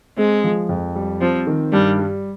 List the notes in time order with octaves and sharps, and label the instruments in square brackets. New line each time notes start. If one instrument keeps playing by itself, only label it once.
[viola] G#3 [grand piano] C4
[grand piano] F3
F2
G3
[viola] F3 [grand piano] C4
[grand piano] D#3
[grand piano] G2 [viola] G3
[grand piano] G3